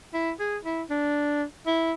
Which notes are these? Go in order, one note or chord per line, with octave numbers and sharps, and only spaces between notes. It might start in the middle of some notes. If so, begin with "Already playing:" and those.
E4
G#4
E4
D4
E4